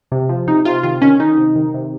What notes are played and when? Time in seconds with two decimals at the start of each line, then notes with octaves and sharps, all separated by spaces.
0.12 C3
0.29 F3
0.47 C3 D#4
0.65 C3 F4
0.83 D#3 F4
1.02 D#3 C#4
1.20 D#3 D#4
1.38 C3
1.56 D#3
1.74 C3